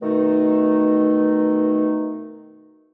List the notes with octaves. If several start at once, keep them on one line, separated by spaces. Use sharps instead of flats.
B2 D#3 A3 D#4